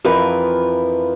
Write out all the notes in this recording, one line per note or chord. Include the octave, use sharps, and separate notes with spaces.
F2 E3 F3 A#4 B4